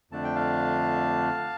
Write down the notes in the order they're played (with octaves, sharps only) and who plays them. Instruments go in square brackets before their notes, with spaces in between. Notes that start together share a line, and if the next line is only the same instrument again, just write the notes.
[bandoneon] F2 D3 A3 D4 A5
G5
F5 A5